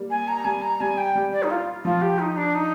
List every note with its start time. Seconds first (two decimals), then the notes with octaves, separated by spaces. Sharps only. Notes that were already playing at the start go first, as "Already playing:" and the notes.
Already playing: G3 A#3
0.10 G#5
0.28 A#5
0.45 G3 G#5
0.62 A#5
0.80 G3 G#5
0.98 G5
1.15 G3
1.32 D5
1.43 D#4
1.50 F4
1.84 F3 F4
2.02 G4
2.19 D#4
2.37 D4
2.55 D#4